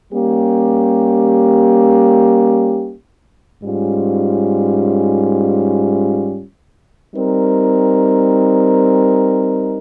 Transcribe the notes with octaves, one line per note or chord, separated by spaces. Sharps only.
G3 A#3 C#4 G4
G#2 G3 C#4 F4
G3 C4 D#4 A#4